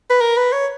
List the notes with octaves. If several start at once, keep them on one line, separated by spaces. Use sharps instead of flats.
B4
A#4
B4
C#5